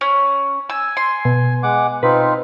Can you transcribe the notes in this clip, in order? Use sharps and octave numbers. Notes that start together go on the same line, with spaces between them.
C#4
G#5 E6
C6
B2
G#3 F#5 D6
C4 D#4 F4 B4